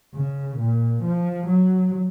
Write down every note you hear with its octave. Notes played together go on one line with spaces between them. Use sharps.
C#3
A#2
F3
F#3